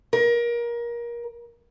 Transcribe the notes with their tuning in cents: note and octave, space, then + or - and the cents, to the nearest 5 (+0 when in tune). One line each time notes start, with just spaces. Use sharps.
A#4 +25